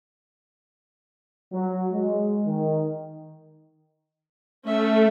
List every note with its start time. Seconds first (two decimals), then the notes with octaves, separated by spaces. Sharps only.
1.52 F#3
1.92 G#3
2.46 D#3
4.64 A3 C#4 E5